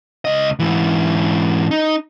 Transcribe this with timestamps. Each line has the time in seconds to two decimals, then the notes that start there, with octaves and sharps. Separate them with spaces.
0.25 C#2 D#5
0.59 G#2 E3
1.71 D#4